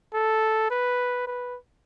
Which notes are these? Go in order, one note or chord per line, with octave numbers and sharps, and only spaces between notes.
A4
B4
B4